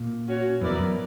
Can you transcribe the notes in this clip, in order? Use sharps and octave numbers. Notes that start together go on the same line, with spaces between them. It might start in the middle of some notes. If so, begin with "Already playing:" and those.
Already playing: A#2
C#4 F#4 C#5
F#2 B3 E4 A#4 D5
E2
F#2